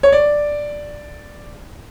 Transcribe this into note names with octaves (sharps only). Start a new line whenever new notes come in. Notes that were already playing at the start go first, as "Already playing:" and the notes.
C#5
D5